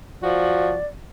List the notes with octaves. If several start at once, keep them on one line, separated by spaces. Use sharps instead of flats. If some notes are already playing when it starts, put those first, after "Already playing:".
F3 F#4 D5